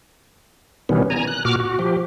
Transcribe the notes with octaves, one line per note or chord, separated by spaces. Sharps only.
B2 D#3 E3 G3 B3 C#4
G#5 A#5
F#6
A#2 F#4 D6 F6
F#4
F3 G4